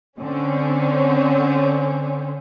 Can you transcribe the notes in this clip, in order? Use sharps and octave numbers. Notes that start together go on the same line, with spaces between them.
D3 C4 C#4